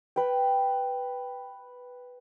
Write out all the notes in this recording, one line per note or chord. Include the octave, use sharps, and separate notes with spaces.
B4 G5